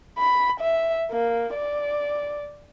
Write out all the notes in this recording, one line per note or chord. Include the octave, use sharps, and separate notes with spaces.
B5
E5
A#3
D5